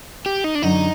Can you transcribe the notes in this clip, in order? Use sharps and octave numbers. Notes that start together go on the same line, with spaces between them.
G4
D#4
D4
F#2 D3 F#3 D#4